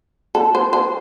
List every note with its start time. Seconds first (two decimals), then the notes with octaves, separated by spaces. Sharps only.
0.35 A4
0.55 C5
0.73 C5